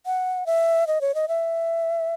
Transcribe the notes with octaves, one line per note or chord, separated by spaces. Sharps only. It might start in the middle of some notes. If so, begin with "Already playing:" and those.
F#5
E5
D#5
C#5
D#5
E5